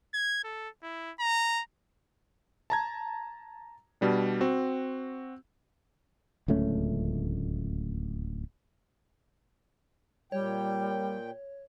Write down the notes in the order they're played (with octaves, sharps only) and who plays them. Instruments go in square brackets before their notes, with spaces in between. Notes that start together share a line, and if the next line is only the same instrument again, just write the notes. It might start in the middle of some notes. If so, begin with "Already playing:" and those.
[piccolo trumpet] G#6
A4
E4
A#5
[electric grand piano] A5 A#5 G#6
B2 G3 D4
C4 F#4
[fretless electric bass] D1 C#2 A3 C#4
[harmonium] A#2 G5 [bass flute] G3 [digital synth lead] C#5